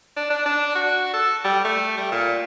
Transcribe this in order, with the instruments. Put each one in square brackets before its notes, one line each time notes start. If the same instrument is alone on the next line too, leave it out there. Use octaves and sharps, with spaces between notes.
[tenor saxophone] D4
D4
D4
F#4
A4
G3
A3
G3
A#2